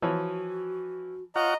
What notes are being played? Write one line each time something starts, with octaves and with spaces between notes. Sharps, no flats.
E3 F3 F#4 C#5
F4 C#5 D#5 F#5 A#5